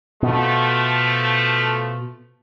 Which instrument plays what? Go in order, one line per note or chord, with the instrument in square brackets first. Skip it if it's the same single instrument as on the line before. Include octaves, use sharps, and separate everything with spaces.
[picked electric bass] B2 [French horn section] F3 A3